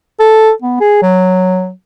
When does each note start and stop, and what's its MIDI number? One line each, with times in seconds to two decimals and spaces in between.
0.20 0.52 69
0.62 0.79 59
0.80 1.00 68
1.02 1.70 54